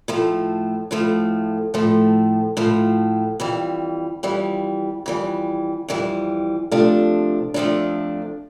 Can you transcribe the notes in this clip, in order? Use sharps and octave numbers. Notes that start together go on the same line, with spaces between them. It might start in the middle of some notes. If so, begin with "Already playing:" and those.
A2 F3 A3
A2 F3 A3
A2 F3 A3
A2 F3 A3
F2 E3 G3
F2 E3 G3
F2 E3 G3
F2 E3 G3
C3 F3 A3 D4
C3 F3 A3 D4